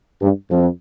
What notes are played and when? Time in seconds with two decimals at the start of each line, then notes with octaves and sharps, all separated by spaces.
0.22 G2
0.50 F2